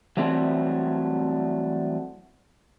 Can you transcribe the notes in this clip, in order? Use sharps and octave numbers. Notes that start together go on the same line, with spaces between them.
E3 F#3 G3 A3 C4